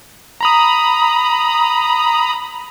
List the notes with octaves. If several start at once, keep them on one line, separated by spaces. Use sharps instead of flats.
A#5 B5 D#6